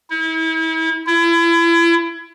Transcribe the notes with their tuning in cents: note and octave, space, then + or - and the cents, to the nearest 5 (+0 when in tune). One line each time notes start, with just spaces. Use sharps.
E4 -35
E4 +35